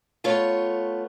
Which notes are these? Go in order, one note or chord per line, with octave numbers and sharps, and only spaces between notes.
A3 B3 F4 C#5